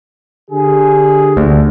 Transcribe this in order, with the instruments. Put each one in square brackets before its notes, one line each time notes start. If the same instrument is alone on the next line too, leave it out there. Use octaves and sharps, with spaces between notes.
[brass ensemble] D3 G4 G#4
[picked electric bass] D2